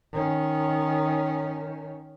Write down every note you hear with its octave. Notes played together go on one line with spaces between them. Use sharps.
D#3 C#4